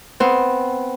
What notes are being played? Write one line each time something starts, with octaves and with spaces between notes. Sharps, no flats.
B3 C4